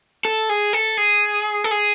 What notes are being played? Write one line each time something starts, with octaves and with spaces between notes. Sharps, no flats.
A4
G#4
A4
G#4
A4
G#4